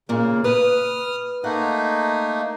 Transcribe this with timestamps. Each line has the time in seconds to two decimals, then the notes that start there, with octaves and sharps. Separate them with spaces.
0.09 A#2 C#3 A#3
0.44 B4 D#6 F6
1.44 A3 A#3 D#4 F#5